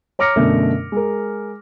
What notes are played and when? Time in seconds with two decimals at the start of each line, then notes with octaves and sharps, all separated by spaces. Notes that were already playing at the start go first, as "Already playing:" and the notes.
0.19 C#5 A#5 D6 F6 A#6 C#7
0.36 F#2 B2 D3 A3 D4
0.92 G#3 A#4